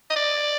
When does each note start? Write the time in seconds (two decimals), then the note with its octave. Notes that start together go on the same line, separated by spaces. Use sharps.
0.10 D#5
0.16 D5